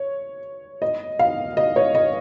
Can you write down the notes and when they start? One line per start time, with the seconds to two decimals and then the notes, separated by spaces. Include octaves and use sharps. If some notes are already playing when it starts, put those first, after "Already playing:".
Already playing: C#5
0.82 D#5
1.19 F5
1.57 D#5
1.76 C#5
1.95 D#5